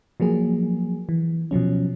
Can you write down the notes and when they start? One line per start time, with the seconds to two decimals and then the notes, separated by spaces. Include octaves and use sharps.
0.20 F3 F#3 A#3 G#4
1.09 E3
1.51 B2 F3 F#3 C#4